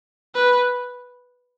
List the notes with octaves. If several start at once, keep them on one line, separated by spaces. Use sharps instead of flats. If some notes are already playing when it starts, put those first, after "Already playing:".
B4